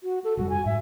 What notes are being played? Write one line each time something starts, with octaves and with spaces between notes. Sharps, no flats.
F#4
A4
F1 G2 G3 F#4
G#5
G#2 E5